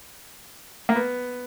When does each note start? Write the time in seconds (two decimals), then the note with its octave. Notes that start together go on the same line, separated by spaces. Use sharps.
0.89 A#3
0.96 B3